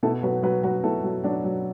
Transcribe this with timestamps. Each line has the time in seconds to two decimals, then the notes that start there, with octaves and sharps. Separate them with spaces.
0.03 B2 E4 A4
0.23 F#3 F#4 B4
0.43 F#3 F#4 B4
0.63 F#3 F#4 B4
0.84 B2 E4 A4
1.04 F#3
1.24 F#3 D4 F#4
1.44 F#3